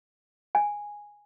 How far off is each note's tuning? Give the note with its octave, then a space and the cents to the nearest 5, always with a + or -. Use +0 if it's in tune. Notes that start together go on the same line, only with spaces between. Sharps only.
G#5 -5